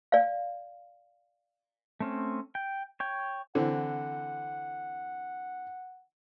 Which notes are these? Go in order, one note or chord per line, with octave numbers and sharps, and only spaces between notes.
D5 F5
A3 C4 C#4
G5
C#5 G5
D3 E3 C4 F#5